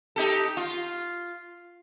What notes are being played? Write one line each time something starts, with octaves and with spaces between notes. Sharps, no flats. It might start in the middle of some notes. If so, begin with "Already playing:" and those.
D#4 G4 A4
F4